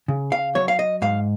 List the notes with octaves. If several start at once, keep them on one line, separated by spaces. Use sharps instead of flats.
C#3
F5
F#3 C#5
F5
D#5
G#2 F5